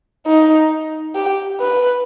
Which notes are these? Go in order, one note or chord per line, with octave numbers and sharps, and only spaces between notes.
D#4
G4
B4